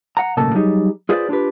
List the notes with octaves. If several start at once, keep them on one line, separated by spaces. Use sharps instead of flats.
F#5 A#5
B1 A2 C#3 A#3 A4 A5
F#3 G3 D#4 G#4
F4 G#4 B4 C5 D5
D4 F4 G4 B4